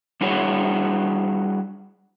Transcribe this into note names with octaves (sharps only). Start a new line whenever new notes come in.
G3 D4 E4 F#4 G#4 C#5